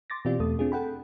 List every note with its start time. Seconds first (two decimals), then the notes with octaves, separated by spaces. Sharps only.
0.10 C6 D6 A6 A#6
0.25 B2 E3 C4 F4 G4 D5
0.40 E2 B2 A3 A4 D#6
0.59 C4 D4 F4 G#4
0.72 A4 F#5 G5 B5